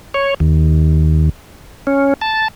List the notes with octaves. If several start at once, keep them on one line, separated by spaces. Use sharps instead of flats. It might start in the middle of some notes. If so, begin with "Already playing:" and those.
C#5
D#2
C#4
A5